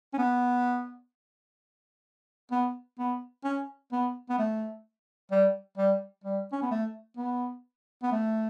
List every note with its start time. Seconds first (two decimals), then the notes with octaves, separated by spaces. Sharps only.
0.13 C#4
0.18 B3
2.51 B3
2.99 B3
3.44 C#4
3.92 B3
4.30 B3
4.38 A3
5.31 G3
5.77 G3
6.24 G3
6.52 C#4
6.62 B3
6.71 A3
7.17 B3
8.03 B3
8.11 A3